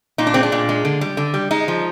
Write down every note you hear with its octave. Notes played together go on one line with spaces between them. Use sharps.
A#2 D#4
D4
G#3 C4
D4
A#2
G#3
D3
G3
D3
G3
G#3 D#4
F3